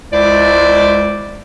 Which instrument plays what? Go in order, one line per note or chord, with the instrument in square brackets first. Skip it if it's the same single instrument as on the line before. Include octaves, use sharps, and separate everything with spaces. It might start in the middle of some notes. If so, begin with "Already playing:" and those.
[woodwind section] C#2 G#3 E4 C5 D5